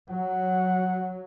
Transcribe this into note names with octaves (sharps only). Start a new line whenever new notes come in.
F#3 F#5